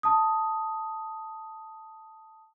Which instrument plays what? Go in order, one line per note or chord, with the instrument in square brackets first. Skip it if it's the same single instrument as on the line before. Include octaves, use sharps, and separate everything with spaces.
[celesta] A5 D#6